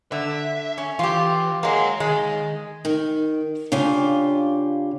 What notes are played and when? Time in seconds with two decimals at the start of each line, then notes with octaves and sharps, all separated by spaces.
0.12 D3 E5
0.78 C#4
0.99 E3 F4 G4
1.63 G#3 A#3 C#5 F#5
2.00 D#3 G#3
2.85 D#3
3.72 C#3 D4 F4 G4 G#5